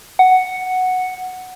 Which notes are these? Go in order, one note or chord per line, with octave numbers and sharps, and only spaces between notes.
F#5